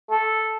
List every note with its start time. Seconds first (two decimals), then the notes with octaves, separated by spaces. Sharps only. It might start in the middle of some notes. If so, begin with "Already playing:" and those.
0.11 A4